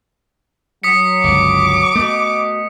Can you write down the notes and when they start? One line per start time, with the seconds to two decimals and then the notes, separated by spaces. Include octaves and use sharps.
0.83 F#3 D#6 B6 C#7
1.24 G1 C#2 D6
1.95 A3 B3 F#4 D#5